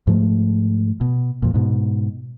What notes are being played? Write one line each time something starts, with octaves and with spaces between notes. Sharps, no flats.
G#2 F3 A3
B2
F2 A#2
G#2 B2